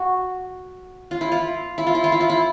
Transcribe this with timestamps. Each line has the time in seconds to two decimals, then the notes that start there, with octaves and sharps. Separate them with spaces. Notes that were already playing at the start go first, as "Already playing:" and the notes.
Already playing: F#4
1.11 F4
1.21 E4
1.32 F4
1.78 E4
1.87 F4
1.95 E4
2.04 F4
2.12 E4
2.21 F4
2.30 E4